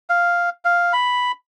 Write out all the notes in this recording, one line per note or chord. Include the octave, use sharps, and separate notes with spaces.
F5
F5
B5